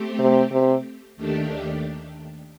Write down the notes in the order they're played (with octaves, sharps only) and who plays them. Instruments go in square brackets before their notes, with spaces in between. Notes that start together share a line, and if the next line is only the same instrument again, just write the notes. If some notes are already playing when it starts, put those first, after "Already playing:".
Already playing: [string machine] A3 C4 G4
[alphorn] C3
C3
[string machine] D#2 D#3 A3 D4 G4